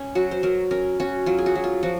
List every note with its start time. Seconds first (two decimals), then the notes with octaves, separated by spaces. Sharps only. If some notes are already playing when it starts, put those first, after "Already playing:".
Already playing: C#4
0.15 F#3 F#4
0.31 C5
0.43 F#3 A#4
0.71 C#4 A#4
1.00 C#4 F#4
1.26 F#3 F4
1.38 G#4
1.46 F#4
1.55 F#3
1.64 F4
1.83 F3 F#4